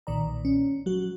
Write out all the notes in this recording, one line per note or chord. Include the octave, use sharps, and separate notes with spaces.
B1 A#2 D#3 D5 A#5
C#4
F#3 F#4